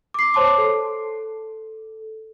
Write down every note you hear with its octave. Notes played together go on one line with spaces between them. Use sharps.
D6 C7
C5 C#5 A5 C6 D6
A4